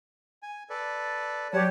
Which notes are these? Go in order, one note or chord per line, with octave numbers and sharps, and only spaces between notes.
G#5
A4 B4 D5
F#3 G4 B4 C#5 D5 F#5 G5 A5